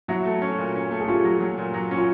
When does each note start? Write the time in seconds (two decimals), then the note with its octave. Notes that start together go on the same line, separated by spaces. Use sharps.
0.08 F#3 E4 F#4
0.25 A3
0.42 C#4
0.58 A#2
0.75 C#4
0.91 A3
1.00 G#4
1.08 C#4 F4 G4
1.25 F#3
1.40 F#3
1.58 A#2
1.74 F#3
1.91 C#4
1.97 F4